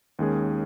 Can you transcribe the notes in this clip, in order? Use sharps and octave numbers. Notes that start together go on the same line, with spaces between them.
D#2 D#3 G#3 C#4 G#4